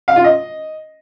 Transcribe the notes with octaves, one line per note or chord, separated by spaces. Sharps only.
F5
F4
D#5